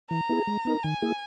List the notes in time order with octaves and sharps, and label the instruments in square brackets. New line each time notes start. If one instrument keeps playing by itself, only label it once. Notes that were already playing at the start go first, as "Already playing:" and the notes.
[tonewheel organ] E3 [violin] A#5
[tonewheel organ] B3 E4 G#4
G#3
B3 D#4 A#4
[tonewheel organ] D#3 [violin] G#5
[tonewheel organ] A#3 E4 G#4